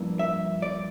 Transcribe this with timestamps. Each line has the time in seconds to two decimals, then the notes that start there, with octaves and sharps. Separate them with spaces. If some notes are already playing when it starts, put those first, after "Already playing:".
Already playing: G2 F3 A#3 E4
0.19 E5
0.62 D5